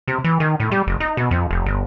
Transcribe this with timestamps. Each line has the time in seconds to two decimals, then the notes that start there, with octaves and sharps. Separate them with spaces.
0.08 C3
0.24 E3
0.40 D#3
0.60 A2
0.71 G3
0.87 F#1
1.00 D#4
1.17 B2
1.31 F2
1.51 F1
1.66 G1